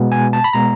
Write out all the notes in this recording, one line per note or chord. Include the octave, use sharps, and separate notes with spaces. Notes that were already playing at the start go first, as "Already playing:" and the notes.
Already playing: B2 G#3 B3
G#5
A5
B5
B2 G#3 B3 A#5